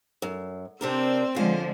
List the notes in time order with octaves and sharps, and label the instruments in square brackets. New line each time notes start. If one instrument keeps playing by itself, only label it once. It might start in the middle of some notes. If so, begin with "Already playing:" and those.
[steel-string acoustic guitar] F#2
[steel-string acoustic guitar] C3 D4 A#4 [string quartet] C4 C5 E6
[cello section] D3 F3 G#3 [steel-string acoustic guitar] C#4 F4 [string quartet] C5